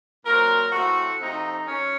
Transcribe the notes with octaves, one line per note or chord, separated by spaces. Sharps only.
A#2 F#3 C4 A#4
A2 A3 C4 F#4
C3 F3 A3 C4 D#4
F#2 C#4